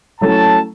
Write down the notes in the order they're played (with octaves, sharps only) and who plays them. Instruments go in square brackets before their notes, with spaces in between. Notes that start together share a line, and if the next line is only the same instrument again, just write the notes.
[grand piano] F#3 A3 C#4 E4 A4 [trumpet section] A5